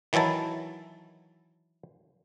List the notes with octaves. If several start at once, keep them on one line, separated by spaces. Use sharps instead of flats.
D#3 E3 F#3 E4 A5